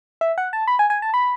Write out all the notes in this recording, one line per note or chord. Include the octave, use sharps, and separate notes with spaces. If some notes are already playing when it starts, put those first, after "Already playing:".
E5
F#5
A5
B5
G#5
G#5
A5
B5